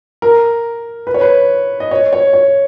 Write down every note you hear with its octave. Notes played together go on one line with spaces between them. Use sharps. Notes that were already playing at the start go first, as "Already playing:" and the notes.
A#4
B4
C#5
B4
D#5
C#5
C#5
C#5